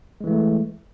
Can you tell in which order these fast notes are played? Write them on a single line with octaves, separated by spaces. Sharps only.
G#3 E3 A3